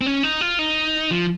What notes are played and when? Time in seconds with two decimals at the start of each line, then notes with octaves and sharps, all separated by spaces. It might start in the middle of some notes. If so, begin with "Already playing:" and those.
0.01 C4
0.06 C#4
0.23 D#4
0.41 F4
0.59 D#4
1.11 F3